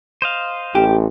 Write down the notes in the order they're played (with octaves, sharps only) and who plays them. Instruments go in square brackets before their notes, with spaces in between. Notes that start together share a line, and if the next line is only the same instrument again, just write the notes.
[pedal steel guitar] C5 D#5 F5
[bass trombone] A1 [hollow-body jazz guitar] G4